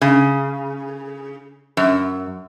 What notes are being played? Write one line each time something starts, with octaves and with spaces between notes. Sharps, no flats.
C#3
F#2